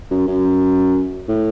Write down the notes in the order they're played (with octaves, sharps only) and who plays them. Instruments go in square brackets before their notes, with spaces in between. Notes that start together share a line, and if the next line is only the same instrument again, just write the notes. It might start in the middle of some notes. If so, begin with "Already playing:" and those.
[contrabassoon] F#2
F#2
A2